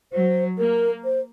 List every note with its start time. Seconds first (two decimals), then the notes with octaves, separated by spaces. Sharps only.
0.13 F#3 C5
0.58 A#3 A#4
1.04 C5